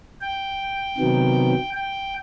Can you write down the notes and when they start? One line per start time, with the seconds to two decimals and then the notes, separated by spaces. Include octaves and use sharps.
0.21 G5
0.98 C3 D#3 F#3 B3
1.74 G5